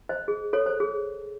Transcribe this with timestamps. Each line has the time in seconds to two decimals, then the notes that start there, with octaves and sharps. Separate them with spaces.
0.09 C5 D#5
0.28 G#4
0.53 A4 C#5
0.66 C5
0.80 G#4